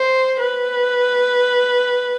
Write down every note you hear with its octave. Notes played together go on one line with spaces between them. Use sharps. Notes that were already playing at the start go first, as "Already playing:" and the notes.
Already playing: C5
B4